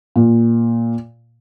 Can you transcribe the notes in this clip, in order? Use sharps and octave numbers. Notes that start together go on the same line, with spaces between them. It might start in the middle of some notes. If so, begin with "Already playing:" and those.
A#2